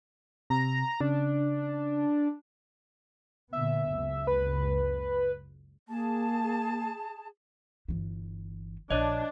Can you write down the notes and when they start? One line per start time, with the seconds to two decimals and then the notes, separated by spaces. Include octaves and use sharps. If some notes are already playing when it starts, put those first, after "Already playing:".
0.50 C3 A#5
1.01 C#3 D4
3.53 A#2 D3 B3 E5
3.91 F#1 C#2
4.27 B4
5.88 A#3 G#4 A5
7.88 G1 E3
8.91 A#1 D4 C#5 D#5